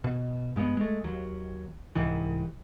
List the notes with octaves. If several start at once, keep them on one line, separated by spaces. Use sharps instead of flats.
B2
G2 G#3 A#3 B3
G#3 A3
D#2 F#3
C2 G#2 D#3 E3